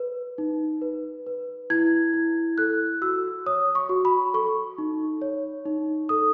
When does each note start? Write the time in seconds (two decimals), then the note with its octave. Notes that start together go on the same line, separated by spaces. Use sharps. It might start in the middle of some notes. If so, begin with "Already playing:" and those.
Already playing: B4
0.38 D#4
0.82 B4
1.26 B4
1.70 E4 G#6
2.14 E4
2.58 A4 F#6
3.02 F#4 E6
3.46 C#5 D#6
3.75 C#6
3.89 F#4
4.05 B5
4.34 A4 C#6
4.78 D#4
5.22 C#5
5.66 D#4
6.09 A4 D#6